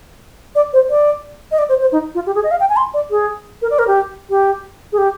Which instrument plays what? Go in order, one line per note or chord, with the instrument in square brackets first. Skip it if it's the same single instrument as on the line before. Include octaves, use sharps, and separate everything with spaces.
[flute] D5
C5
D5
D#5
D5
C5
C5
D#4
F4
G4
G#4
D#5
F5
G5
G#5
C6
D5
G#4
A#4
D5
A#4
G4
G4
G#4
G4